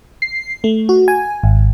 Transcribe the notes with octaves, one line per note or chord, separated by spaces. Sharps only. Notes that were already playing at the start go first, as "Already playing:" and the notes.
C7
A3
F#4
G#5
G#1